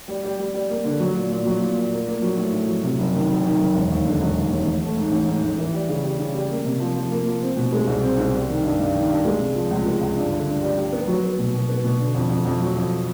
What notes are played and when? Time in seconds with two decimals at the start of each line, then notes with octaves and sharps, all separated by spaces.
0.08 G3
0.23 G3
0.39 G3
0.54 G3
0.69 A#3
0.85 D3
1.00 F#3
1.15 A#2
1.30 A#2
1.45 F#3
1.61 A#2
1.76 A#2
1.91 A#3
2.07 A#3
2.22 F#3
2.37 A2
2.52 A2
2.68 F#3
2.83 C3
2.99 F#1
3.13 D#3
3.29 F#1
3.45 D#3
3.59 F#1
3.75 E1
3.90 D#2
4.06 D3
4.21 E1
4.36 D#2
4.51 D#2
4.66 A1
4.82 A3
4.97 G#2
5.12 A1
5.27 G#2
5.43 A1
5.58 E3
5.73 G3
5.88 C#3
6.04 G3
6.19 C#3
6.34 G3
6.50 A#3
6.65 C3
6.80 F3
6.95 F3
7.10 A#3
7.26 F3
7.42 C4
7.57 B2
7.72 G#3
7.87 C2
8.03 C4
8.18 C2
8.33 G3
8.48 D#3
8.63 G2
8.79 G2
8.94 D#3
9.09 G2
9.25 G#3
9.40 C3
9.55 F3
9.71 C#2
9.86 G#3
10.01 C#2
10.16 G2
10.31 D3
10.47 G2
10.62 G3
10.77 G3
10.92 B3
11.08 F#3
11.24 B3
11.39 B2
11.54 B2
11.69 B3
11.84 B2
12.00 D3
12.15 F2
12.30 F2
12.45 F2
12.61 F#3
12.76 F2